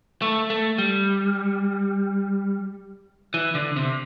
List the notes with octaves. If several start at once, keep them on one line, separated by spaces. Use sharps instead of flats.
A3
A3
G3
E3
D3
C3